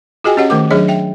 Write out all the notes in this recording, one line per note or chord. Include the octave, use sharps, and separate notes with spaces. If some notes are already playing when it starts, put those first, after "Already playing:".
F4 F#4 G#4 D#5 G5 G#5
C#4 G4 C#5 D#5 F#5
D#3 A3 A#4 D6
F#3 D4 G#4 C#5 D#5
E5 G5